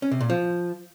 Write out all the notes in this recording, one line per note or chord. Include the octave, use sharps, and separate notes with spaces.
C#4
C3
A#2
F3